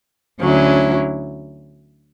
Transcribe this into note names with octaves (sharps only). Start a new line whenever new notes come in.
D2 D3 F#3 C#4 E4